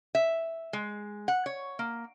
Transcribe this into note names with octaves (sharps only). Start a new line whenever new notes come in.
E5
G#3
F#5
C#5
A#3